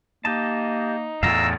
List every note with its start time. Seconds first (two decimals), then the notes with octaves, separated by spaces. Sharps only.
0.25 A#3 D#4 G4 D#5 A5
1.23 E2 A2 F5 A#5 E6